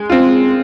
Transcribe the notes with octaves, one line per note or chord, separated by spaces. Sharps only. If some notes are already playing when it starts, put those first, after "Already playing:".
Already playing: G#3
C4 F4